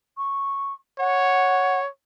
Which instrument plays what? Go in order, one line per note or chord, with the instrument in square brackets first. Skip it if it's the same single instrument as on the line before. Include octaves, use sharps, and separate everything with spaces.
[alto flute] C#6
[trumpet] C#5 [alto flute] F#5